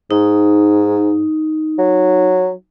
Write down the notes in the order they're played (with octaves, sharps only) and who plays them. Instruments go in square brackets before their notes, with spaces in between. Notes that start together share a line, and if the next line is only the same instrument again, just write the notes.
[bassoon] G#2 [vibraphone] D#4
[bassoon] F#3